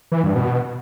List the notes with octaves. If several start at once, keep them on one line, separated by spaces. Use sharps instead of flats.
E3
G2
B2